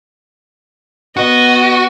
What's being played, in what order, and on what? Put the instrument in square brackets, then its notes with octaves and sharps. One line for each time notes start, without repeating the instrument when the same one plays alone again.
[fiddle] B3 D#5 [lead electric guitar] F#4